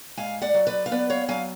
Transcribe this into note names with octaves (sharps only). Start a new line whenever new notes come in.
G#2 F5 G#5
D5 F#5
F#3
B4 D5
F5
B3 B4 D5
C#5 F5
F#3 F5 G#5